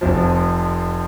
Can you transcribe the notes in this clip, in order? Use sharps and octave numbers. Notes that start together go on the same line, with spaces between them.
F1 F2 F3